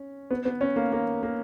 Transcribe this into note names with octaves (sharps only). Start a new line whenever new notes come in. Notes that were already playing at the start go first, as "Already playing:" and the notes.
Already playing: C#4
B3
B3
C#4
A#3
A#3
A#3